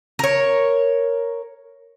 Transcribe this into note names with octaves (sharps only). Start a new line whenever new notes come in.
A#4 C#5